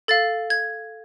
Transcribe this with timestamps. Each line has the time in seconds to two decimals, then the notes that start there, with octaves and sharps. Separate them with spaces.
0.08 A4 F5 A6
0.50 G#6